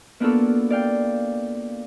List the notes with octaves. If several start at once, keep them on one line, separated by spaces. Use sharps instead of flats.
A#3 B3 D4 F4 F#4 A4
D5 F5 G5